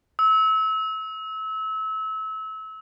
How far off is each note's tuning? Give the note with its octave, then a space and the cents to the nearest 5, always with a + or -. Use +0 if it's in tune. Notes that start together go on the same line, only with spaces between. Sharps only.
E6 -30